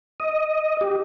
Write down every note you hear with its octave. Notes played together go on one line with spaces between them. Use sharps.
D#5
G4